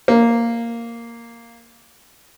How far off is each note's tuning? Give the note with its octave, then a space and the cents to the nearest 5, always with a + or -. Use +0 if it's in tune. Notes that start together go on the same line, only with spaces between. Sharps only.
A#3 -5